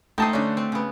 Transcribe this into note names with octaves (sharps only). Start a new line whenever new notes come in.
A3 D#4 C5 G5 A5 D#6
D3 C#4 D4 F#4
C4
C#3 B3